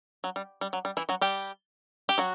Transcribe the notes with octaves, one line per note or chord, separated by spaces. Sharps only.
F#3
G3
G3
F#3
G3
E3 E4
F#3 F#4
G3 G4
G4
F#3 F#4